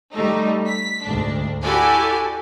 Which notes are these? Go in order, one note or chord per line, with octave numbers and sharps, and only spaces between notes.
G3 A3 D#4
B6
D2 G#2 D4
E4 F#4 G4 A4 D5 G#5